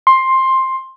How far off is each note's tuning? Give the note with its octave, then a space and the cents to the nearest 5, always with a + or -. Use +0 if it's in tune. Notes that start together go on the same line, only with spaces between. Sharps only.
C6 +10